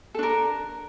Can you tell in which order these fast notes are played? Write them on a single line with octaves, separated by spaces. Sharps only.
A4 D4 A#4